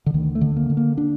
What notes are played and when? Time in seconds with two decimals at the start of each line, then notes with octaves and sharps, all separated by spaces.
0.06 D3
0.14 D2 D#3
0.35 A3
0.41 D3
0.56 A#3
0.70 D3
0.77 A#3
0.97 D4